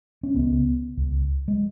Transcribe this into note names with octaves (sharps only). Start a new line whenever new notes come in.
C#4
C#2 C#3 B3
C#2 C#3
G#3